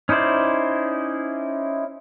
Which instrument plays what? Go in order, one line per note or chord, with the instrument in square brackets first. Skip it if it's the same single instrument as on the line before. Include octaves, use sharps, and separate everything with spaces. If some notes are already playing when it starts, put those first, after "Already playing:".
[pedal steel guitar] C#4 D#4 E4 C5 D5